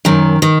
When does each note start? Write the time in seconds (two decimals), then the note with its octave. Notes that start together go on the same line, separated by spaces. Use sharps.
0.05 F#2 D#3
0.42 D#3